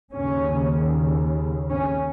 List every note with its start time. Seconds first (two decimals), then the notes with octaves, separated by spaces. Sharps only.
0.12 D#2 C#3 C#4
1.70 C#4